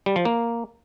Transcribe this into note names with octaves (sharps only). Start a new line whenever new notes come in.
G3
F3
A#3